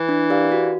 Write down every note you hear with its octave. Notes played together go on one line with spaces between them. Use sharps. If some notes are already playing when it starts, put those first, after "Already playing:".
Already playing: E3
D4
G4 A#4 D5 F5
F#4